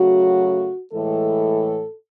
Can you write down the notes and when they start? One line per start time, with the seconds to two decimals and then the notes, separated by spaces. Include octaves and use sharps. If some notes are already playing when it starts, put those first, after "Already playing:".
Already playing: C#3 F#3 A3 F#4
0.93 A2 E3 G#3 A4